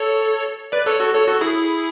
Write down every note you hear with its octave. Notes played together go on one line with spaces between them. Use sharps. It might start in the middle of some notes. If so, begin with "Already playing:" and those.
Already playing: A4 C#5
B4 D5
A4 C#5
F#4 A4
A4 C#5
F#4 A4
E4 G#4